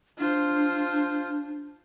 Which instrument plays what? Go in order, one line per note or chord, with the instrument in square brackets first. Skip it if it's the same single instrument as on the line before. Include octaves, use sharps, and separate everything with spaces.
[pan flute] D4 [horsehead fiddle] F4 C5